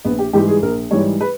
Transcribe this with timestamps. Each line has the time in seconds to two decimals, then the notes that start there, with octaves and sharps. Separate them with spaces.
0.05 A#1 B3
0.19 G4
0.33 G#2 E3 G3 G4
0.48 G#4
0.62 A#1 A#4
0.91 G#2 E3 G3 C#5
1.21 B4